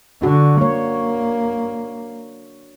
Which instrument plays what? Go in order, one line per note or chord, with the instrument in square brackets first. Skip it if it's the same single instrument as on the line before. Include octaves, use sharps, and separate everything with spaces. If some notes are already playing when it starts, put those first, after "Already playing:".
[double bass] D3 [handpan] D4 F#4
[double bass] A#3 [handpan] C#5